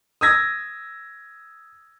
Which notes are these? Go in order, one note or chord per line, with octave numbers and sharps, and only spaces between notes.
D#6 E6 G#6 A#6